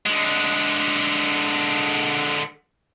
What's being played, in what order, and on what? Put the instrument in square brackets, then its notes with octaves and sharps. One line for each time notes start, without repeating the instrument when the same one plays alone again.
[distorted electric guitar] D3 G#3